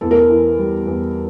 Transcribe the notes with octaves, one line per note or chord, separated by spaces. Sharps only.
E2 A4
A#4
A4
E3
G3
E2